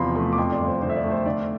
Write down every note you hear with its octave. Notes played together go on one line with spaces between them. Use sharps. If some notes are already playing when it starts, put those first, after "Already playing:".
Already playing: E2 C3 F3 B5 C6
A3 C6
D6
F2 C6
D5
G1
C5
D3 C5
E5
D5
A3
C5
D3 D5